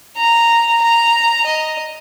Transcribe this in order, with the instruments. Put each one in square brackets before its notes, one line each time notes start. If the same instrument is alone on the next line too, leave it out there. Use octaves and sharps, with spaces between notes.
[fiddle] A#5
A#5
D#5